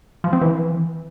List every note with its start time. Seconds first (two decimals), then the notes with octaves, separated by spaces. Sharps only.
0.24 F3
0.33 C4
0.41 E3